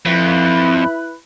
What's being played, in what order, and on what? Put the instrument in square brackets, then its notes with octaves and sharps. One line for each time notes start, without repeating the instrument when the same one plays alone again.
[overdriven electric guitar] F2 [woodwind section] E4 B4